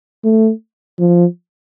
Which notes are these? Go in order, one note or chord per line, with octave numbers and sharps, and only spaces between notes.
A3
F3